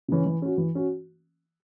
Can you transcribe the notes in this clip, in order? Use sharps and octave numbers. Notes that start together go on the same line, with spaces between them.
C#3 E3 C#4
E3
C#4 F#4
E3
C#4 F#4